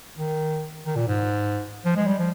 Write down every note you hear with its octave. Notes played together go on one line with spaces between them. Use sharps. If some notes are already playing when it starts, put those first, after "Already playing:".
D#3
D#3
A#2
G#2
F3
G#3
G3
F3